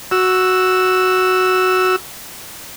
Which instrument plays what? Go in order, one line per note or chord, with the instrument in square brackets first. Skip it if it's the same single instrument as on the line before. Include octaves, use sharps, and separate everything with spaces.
[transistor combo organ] F#4 E6